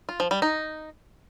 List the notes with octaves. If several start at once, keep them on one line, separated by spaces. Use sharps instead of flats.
F4
F3
G3
D#4